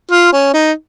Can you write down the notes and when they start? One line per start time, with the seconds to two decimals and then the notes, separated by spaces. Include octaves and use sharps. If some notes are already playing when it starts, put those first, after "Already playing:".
0.11 F4
0.33 C#4
0.54 D#4